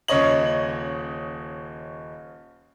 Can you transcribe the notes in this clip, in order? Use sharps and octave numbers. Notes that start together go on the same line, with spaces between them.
D#1 C#3 C#5 D#5 F#7